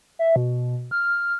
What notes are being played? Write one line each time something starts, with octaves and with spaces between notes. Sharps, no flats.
E5
B2
F6